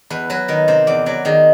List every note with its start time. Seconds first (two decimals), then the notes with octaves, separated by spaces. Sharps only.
0.10 E2 B4
0.30 F#3 B4
0.48 D#3 A#4
0.68 C3 C5
0.87 E2 D5
1.06 F#3 D5
1.25 D#3 G#4